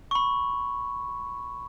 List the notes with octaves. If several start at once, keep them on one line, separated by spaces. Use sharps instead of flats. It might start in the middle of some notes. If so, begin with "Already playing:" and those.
B5 C#6